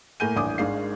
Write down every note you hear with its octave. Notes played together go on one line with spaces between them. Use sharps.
A2 A#3 G#5 G6 D#7
D#1 A1 D4 G#5 D6 D#6
G#1 G#2 D4 G#4 F5 C7